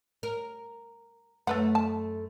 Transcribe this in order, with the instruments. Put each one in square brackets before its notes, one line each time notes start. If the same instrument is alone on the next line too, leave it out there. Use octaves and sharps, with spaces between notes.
[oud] A#4
[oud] F#2 A3 [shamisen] A4 B4 F#5
[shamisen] A5